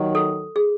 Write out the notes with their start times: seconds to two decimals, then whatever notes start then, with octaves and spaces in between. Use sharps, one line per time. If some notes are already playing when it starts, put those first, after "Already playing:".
Already playing: D#2 D#3 F#3
0.15 A4
0.56 G#4